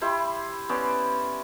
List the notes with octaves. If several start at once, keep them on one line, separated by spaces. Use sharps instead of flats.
E4 G4 C5 B5
B3 C#4 C5 D5